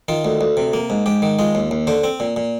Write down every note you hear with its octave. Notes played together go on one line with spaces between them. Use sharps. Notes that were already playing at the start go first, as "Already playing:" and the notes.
D#3 F4
D2
D2
C3
A#3
G#2
G#2 G4
D#3
G#3 F4
D#2
D#2
D3 C5
C4
A#2
A#2